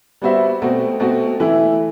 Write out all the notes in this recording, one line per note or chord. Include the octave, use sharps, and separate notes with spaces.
G3 B3 F#4 C5 E5
B2 A3 C4 F#4
B2 A3 C4 F#4
E3 A3 E4